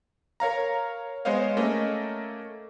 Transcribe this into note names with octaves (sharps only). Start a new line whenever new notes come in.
A#4 C#5 F5 A#5
G#3 B3 C5 C#5 D#5 F5
A3 A#3 C#4 D#5